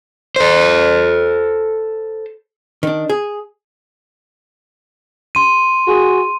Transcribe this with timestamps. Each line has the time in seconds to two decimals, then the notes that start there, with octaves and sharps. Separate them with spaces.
0.36 A4 C5
2.83 D#3 D4
3.09 G#4
5.35 C6 D#7
5.88 F#4 G#4